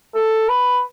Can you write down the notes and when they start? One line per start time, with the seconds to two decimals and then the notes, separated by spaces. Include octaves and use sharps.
0.15 A4
0.49 B4